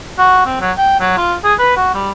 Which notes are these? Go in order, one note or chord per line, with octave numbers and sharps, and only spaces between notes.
F#4
C4
F#3
G5
F#3
F4
G#4
B4
F#4
G3